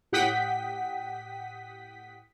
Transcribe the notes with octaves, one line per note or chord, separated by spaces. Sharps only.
A2 G4 F#5 G5 D#6 B6